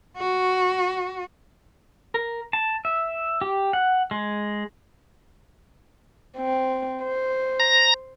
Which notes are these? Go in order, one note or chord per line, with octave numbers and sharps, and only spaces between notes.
F#4
A#4
A5
E5
G4
F#5
G#3
C4
C5
A#5 A#6